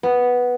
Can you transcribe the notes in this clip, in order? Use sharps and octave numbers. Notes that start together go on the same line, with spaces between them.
B3